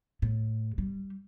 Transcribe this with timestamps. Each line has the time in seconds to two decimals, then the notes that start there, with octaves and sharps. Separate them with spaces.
0.22 A2
0.78 G3